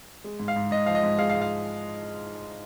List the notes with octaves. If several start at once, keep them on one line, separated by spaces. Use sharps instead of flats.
G#3
G#2
F5
G#2
G#2 D#5
F3 F5
D#5
G#2
G#3 F5
F5
G#2
F5